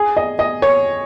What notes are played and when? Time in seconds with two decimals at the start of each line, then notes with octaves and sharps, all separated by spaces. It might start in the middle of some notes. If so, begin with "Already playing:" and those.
Already playing: G#4
0.17 D#5
0.39 D#5
0.62 C#5